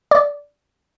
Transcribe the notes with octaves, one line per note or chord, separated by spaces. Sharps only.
D5